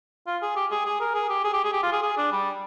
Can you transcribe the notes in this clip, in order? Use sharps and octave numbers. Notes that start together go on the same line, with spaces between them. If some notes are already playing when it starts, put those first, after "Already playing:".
F4
G#4
G4
G#4
G#4
A#4
G#4
G4
G#4
G4
G#4
G4
F4
G#4
G#4
D4
G3